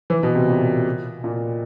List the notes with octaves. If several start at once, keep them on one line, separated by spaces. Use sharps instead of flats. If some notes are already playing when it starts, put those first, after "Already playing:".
E3
B2
C3
A#2
A#2